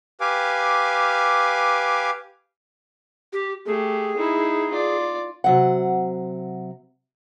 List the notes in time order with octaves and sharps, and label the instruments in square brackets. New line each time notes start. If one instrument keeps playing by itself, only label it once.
[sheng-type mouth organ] G4 B4 F5 G#5 D6
[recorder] G4
[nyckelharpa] A3 G4 [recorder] G#4
[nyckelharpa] D#4 E4
F4 D5
[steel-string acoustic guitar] C3 F#3 F#5